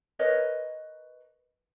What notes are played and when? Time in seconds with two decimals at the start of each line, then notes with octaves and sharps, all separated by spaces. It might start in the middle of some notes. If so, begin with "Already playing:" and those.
0.19 A#4 B4 C#5 D#5